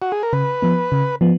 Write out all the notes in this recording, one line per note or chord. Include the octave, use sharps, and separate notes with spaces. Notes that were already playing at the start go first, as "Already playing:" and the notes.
F#4
G#4
A#4
C#3 B4
F3 B3
C#3
F3 B3